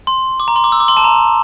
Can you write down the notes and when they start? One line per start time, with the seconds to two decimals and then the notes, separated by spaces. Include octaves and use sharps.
0.07 C6
0.40 D6
0.48 A#5
0.56 C6
0.64 D6
0.72 E6
0.80 D6
0.88 C6
0.97 A5
1.04 A#5